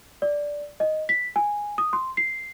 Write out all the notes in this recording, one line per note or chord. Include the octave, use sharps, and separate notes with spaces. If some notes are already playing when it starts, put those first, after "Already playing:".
D5
D#5
B6
G#5
D#6
C6
C7